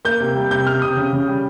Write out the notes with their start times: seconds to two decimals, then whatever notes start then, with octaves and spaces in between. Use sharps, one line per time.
0.05 A#3 G6
0.20 C3
0.35 G3
0.51 C3 G6
0.67 C3 F6
0.82 C3 D#6
0.97 C#3
1.13 C#3
1.28 G3